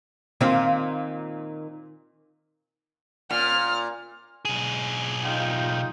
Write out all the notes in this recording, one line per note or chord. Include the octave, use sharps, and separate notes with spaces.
A#2 D#3 C4 F4
A#2 F6
B1 G#4
D#4 F4 G5